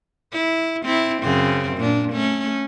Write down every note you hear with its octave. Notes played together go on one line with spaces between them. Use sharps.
E4
C4 E4
F#2 C#3 C4
A#2 D4
A3 C#4